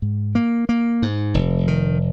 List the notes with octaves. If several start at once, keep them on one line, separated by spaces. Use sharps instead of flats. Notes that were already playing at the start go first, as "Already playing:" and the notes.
G#2
A#3
A#3
G#2
F1
D#3